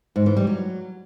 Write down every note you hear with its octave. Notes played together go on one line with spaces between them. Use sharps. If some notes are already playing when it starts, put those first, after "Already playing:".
G#2
E3
G3
F#3